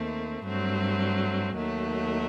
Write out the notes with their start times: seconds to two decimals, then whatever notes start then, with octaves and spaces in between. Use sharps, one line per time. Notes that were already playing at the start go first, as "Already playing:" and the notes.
Already playing: D#2 D#3 A3 C4
0.44 G2 F#3 A3 C4
1.57 D#2 D#3 F#3 A3